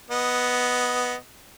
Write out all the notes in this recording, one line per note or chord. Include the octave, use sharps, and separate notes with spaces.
B3 D#5